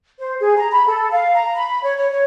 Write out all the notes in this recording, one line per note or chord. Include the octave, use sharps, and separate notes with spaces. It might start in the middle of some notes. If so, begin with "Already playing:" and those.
C5
G#4
A#5
B5
A4
F5
A#5
B5
C#5
C#5
C#5